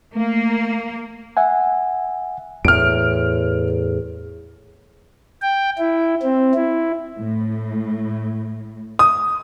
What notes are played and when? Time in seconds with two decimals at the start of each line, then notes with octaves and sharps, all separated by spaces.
0.15 A3 A#3
1.37 E5 F#5 G#5
2.65 E2 A2 F6 D7
5.42 G5
5.78 E4
6.22 C4
6.54 E4
7.16 A2
8.99 D#6